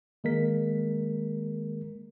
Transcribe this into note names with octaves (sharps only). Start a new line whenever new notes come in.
D#3 G#3 A#3 A#4 B6